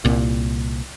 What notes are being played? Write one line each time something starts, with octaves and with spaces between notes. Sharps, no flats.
C2 A#2